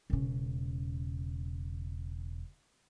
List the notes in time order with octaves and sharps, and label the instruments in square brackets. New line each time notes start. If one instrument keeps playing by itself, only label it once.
[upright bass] E1 C#3